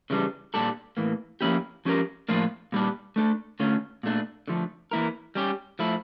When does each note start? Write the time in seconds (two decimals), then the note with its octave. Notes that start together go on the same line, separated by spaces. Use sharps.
0.10 C#3 E3 G3 D4
0.54 A#2 G3 D4 A4
0.97 A2 E3 A#3
1.41 F3 A#3 C#4 E4 G4
1.85 F3 C#4 G4 A#4
2.29 A2 F3 A#3 D4 F4
2.72 A#2 G3 D4
3.16 A3 D4 A4
3.60 D3 A3 C#4 F4
4.03 A#2 A3 D4
4.48 D3 F3 A3
4.91 E3 A#3 E4 A#4
5.35 G3 C#4 G4
5.79 F3 A3 E4